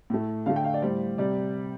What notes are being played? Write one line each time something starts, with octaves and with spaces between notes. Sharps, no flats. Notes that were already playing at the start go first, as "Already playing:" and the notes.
A2 A3
D3 A3 F5
G5
F5
D5
A2 G3 C5
C3 G3 D5